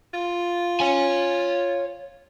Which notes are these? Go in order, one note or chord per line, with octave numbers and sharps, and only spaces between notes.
F4
C#5 G#5